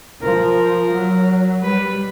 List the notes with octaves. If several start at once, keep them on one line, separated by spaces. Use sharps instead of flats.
F3 A#4
F#3
G3 B4